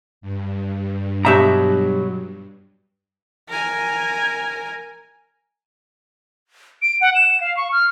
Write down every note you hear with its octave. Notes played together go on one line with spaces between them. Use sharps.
G2
B2 F#3 G4 E5 A#5
A#4 G#5
D7
F#5
E7
F5
C#6
F6